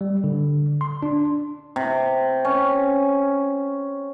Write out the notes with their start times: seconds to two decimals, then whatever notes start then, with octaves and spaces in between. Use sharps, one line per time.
0.01 G3
0.24 D3
0.81 C6
1.02 D4
1.76 C3
2.45 C#4